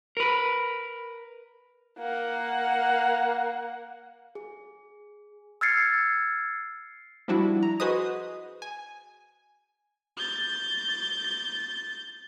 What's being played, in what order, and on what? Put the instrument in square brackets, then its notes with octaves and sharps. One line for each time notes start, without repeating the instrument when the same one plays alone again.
[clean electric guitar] A#4 B4
[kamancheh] A#3 F#5
[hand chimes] G#4
E6 F6 G#6 A6 C7 C#7
[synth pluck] F3 G3 D4 E4 F#4
A#5
F#4 G#4 B4 C5 D#5 D#6
G#5
[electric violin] G6 A6